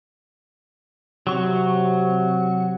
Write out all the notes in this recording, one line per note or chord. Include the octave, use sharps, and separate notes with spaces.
C3 F#3 C#6